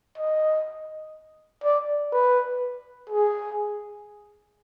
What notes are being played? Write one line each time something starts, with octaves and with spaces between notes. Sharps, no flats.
D#5
D5
B4
G#4